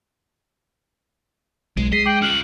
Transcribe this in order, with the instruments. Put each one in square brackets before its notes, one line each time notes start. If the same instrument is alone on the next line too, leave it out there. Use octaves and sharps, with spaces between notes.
[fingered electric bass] B1 [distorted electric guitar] G#3
[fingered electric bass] G#3 [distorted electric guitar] D#5 [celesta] B6 [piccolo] C7
[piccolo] G5 [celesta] D6 C7 F#7
[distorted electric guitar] C#4 F4 [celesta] F6 F#6 G7 [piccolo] F#7